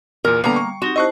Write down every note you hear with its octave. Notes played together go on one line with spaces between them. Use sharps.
E2 A#2 A#4
D3 G3 A#3 B3 A#5
C#6
C4 D#4 F#4 G4
E4 C5 D#5 A5 C#6 F#6